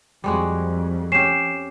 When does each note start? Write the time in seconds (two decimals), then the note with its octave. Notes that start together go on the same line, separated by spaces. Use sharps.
0.24 F2 G3 G#3 F#4
1.12 C#4 G4 C7 E7